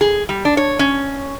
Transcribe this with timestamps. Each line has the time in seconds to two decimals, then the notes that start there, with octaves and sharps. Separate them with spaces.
0.01 G#4
0.29 G3
0.45 D4
0.57 C#5
0.79 C#4